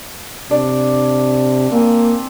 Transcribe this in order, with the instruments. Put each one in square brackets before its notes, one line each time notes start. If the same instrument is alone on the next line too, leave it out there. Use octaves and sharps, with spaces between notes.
[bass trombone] C3 [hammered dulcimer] D4 D5
[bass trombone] A#3 [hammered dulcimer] C4 G#5